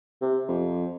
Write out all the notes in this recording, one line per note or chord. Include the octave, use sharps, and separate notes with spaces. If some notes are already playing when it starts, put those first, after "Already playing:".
C3
F2